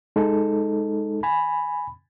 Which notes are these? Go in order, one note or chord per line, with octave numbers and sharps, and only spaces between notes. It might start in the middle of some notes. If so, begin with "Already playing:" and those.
G#3 D#4 A4
G#5 B5